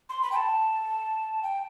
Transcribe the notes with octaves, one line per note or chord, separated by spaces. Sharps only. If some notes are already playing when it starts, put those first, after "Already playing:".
C6
B5
G5
A5
G5